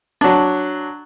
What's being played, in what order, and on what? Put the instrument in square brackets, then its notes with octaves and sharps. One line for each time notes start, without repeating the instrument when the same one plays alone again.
[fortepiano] F#3 D4